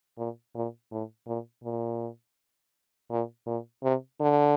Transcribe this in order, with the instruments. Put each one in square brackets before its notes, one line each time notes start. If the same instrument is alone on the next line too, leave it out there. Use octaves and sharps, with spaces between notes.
[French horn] A#2
A#2
A2
A#2
A#2
A#2
A#2
C3
D3